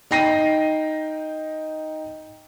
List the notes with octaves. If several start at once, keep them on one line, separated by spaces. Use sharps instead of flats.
D#4 G5 A#6 C7 D#7